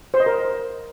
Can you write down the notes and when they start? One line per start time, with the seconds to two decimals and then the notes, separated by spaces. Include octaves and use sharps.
0.14 C5
0.20 D#5
0.26 A#4